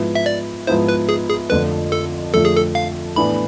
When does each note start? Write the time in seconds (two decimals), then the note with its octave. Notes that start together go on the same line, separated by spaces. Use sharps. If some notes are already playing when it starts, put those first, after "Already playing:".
Already playing: G#2 F3 B3 E4
0.15 E5
0.26 D5
0.67 G#2 F3 B3 E4 C5
0.88 B4
1.09 G#4
1.29 G#4
1.50 F2 D3 F3 A3 B4
1.92 A4
2.34 F2 D3 F3 A3 A4
2.45 G#4
2.56 A4
2.75 F5
3.16 A2 E3 B3 D4 B5